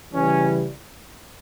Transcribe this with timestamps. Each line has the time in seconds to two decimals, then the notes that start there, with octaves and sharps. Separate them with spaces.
0.12 C#3 E3 G3 C#4